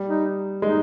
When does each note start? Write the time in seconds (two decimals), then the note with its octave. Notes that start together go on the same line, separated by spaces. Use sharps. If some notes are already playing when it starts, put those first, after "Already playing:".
Already playing: G3
0.09 D#4
0.62 G#3 D#4